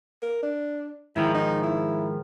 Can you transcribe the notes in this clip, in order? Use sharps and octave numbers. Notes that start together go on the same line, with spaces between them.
A#4
D4
G#2 D#3 F3 E4
D#4
E4